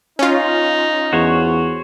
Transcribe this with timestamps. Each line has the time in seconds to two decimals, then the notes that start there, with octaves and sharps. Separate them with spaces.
0.19 C#4 D#4 F4
1.13 E2 F#4 C5 C#5